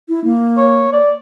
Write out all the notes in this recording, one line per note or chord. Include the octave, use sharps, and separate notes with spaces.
E4
A#3
C#5
D5